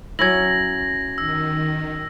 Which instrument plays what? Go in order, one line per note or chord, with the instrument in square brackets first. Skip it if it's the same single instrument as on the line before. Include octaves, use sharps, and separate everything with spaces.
[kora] F#3 C#4 E4 [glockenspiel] G#6 F#7 [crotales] A#6
[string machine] D#3 [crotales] E6